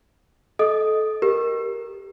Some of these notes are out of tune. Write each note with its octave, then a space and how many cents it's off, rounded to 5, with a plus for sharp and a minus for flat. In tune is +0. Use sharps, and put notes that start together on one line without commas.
A4 -20 D#5 +0 D#6 +0
G4 -5 A#4 +0